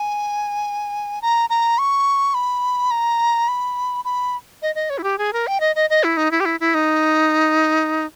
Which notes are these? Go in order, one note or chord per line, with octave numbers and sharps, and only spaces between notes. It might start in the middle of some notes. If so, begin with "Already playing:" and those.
Already playing: G#5
A#5
A#5
C#6
B5
A#5
B5
B5
D#5
D#5
C#5
E4
G4
G#4
A#4
G5
D#5
D#5
D#5
E4
D#4
E4
G4
E4
E4
D#4